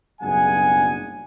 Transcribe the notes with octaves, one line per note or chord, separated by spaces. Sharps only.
F#1 B1 G2 G#4 F#5 G#5